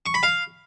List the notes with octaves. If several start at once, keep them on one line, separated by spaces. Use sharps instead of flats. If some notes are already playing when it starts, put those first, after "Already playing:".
C#6
B5
F5